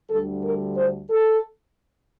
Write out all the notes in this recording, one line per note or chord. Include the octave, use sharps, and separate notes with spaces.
D2 D3 G3 A4
A#4
C5
A4